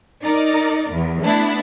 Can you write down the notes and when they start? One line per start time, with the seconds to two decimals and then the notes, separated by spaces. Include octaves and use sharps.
0.24 D#4 A#4 D5
0.91 E2
1.22 A3 B3 D4 E4